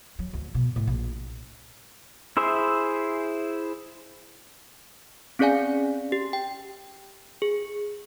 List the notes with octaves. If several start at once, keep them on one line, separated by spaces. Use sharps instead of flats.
F#3
D2
B2
A2
A#1
E4 G#4 C5 E5
C4 C#4 G#4 D5 F5 G#5
G4
G5
G#4